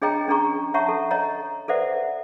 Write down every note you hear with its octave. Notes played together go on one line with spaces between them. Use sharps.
D4 G#4 C#5 D#5 G5 A#5
C#4 D4 G#4 A#5 C#6
C#5 E5 F#5 A5 A#5 C#6
A4
C#5 D#5 A#5
A4 B4 C5 D5 E5 F#5